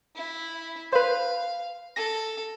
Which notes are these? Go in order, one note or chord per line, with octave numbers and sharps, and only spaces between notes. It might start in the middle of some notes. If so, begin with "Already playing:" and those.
E4
B4 C5 F5
A4 A#6